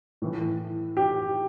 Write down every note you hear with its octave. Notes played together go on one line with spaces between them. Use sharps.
A2 E3
G4